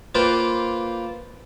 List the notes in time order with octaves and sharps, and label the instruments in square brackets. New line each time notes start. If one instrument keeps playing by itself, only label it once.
[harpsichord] A#3 F4 B4 C5 D5 G5